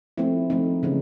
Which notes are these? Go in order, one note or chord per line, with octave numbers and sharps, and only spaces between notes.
F3 A3 C4 E4
F3 A3 C4 D#4
C#3 E3 G#3 C#4